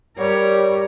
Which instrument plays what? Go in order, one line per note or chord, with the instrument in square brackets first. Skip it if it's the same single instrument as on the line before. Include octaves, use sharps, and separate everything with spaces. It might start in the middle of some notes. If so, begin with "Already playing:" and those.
[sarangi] G3 [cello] A#4 C#5